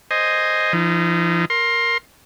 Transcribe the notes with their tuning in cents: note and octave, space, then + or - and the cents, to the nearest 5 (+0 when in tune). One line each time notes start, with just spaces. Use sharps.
C5 +0 D#5 +0 G#5 +0
F3 -40 D#4 +0
A#4 +0 C6 +20